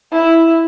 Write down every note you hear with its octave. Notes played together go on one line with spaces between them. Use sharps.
E4